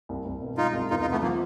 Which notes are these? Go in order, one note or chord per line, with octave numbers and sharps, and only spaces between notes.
C2
C2
B2
G#3 D#4 F4
C2
E2 D#4 F4
D#4 F4
C3
A3 B3
F3 A#3